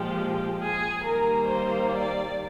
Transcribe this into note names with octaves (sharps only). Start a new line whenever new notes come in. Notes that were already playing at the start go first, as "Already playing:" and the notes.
Already playing: A#2 F3 G#3 G4
G#4
D#3 G3 A#3 A#4
C5
D5